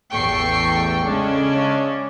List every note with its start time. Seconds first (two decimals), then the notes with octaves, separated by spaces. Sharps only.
0.12 A1 E2 A4 G5 C#6 C7
1.05 C#3 G#3 C#4 D4